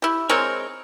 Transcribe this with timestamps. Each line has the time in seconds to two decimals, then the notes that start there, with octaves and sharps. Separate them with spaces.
0.02 E4 G4
0.29 G#3 C4 A#4 C#5